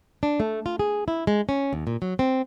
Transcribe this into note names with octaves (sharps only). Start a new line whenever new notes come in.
D4
A3
F4
G#4
E4
G#3
C#4
D#2
A#2
F#3
C4